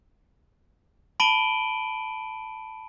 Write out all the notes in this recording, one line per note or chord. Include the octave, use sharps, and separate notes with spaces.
A5 B5 D7 D#7 F#7 G7